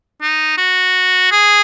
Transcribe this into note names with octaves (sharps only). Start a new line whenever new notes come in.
D#4
F#4
G#4